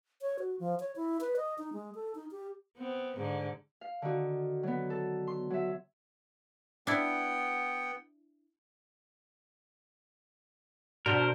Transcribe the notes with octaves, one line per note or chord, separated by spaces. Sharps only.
C#5
F#4
F3
C#5
E4
B4
D#5
D#4
G#3
A4
D#4
G4
B3 C4
G#2 D3
F5
D3 D#3 F#4
F#3 B3
A4
C6
F#3 E5
B3 D4 E4 F#5 G5
B2 D4 F#4 A#4 C5